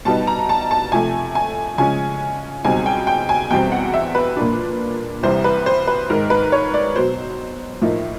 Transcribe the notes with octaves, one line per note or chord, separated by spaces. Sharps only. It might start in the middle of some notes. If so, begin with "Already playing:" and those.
B2 G3 B3 D#4 A5
A#5
A5
A5
C3 F3 A3 G#5
G#5
C#3 F3 G#3 C#4 G#5
C#2 B2 G3 C4 D#4 G#5
G5
G5
G#5
E2 B2 G3 C4 G5
F#5
E5
B4
A#2 F3 A#3 D4
C2 C3 E3 G3 C5
B4
C5
B4
G#2 D#3 G#3 A#4
B4
C#5
D5
B2 F#3 B3 C5
A2 F3 A#3 D#4